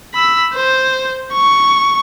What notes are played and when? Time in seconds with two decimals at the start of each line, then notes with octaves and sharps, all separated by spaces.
0.14 B5 E6
0.54 C5
1.33 C#6